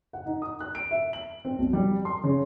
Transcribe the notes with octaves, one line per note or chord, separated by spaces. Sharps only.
F#5
D#4
D#6
F#6
D7
E5
F#7
C4
B1
G3
C6
C#3